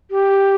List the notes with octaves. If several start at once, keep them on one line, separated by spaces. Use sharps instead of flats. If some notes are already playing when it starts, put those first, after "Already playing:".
G4